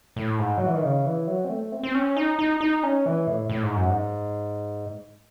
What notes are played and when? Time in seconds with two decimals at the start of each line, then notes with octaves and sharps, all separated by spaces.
0.16 A2
0.38 G#2
0.58 F#3
0.66 E3
0.75 D#3
0.83 C#3
1.05 E3
1.27 F#3
1.44 C4
1.49 A3
1.72 C4
1.83 C4
1.94 C#4
2.17 D#4
2.39 D#4
2.61 D#4
2.83 C#4
3.06 E3
3.27 A2
3.49 A2
3.63 G#2
3.76 F#2
3.90 G#2